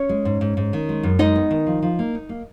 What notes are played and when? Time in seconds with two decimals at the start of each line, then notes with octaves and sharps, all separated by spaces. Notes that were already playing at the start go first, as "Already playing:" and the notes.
Already playing: C#4 C#5
0.09 G#3
0.25 G#2
0.41 G#2
0.57 G#2
0.73 D#3
0.89 G#3
1.03 F#2
1.19 G#3 D#4 D#5
1.36 B3
1.51 D#3
1.67 F3
1.82 F3
1.99 A#3
2.15 D#4
2.29 A#3